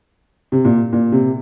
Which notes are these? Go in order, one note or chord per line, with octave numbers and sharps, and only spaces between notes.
C3
A#2
A#2
C3